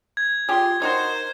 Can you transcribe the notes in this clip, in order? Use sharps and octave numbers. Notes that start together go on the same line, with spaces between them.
G#6
F4 G4 G#4 C6
D#4 F#4 A#4 C5 C6